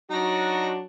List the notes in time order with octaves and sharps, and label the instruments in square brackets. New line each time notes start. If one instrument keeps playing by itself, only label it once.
[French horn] F#3 [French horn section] D4 F#4 [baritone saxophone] D#4